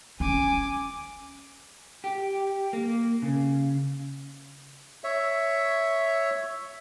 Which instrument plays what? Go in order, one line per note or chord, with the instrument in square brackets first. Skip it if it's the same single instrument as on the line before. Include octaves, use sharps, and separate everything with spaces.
[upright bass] C#4 [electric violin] G#5 D6
[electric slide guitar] G4
A#3
C#3
[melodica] C#5 E5